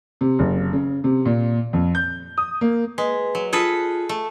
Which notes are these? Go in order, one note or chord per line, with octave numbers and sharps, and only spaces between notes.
C3
F#1
C#3
C3
A#2
F2
G6
D#6
A#3
G#3 B4
F#3
F4 G#4 A4 B4
A3